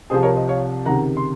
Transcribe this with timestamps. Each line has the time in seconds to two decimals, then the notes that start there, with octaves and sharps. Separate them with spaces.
0.10 C2 C3 F3 G#4 C5
0.23 A#4 C#5
0.35 C5 D#5
0.48 C#5 F5
0.86 C#2 C3 D#3 F#5 A#5
1.17 C6